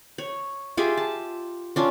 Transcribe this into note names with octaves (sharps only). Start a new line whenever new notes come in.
C#5
F4 G4 G#4 E5
A5
C#4 D4 F4